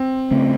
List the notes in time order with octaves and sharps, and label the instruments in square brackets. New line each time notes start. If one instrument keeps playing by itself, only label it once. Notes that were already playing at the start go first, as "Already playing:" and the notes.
Already playing: [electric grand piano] C4
[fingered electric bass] C#3 A3 C4